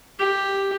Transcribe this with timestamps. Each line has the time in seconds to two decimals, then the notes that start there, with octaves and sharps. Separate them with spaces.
0.19 G4